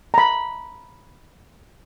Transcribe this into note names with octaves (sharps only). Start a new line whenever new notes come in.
A#5 B5